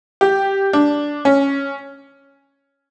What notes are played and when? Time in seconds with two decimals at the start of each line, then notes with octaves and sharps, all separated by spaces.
0.21 G4
0.73 D4
1.25 C#4